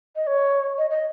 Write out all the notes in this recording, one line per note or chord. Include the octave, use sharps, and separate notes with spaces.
D#5
C#5
D#5
D#5